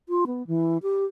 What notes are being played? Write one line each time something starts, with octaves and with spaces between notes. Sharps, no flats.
F4
B3
E3
G4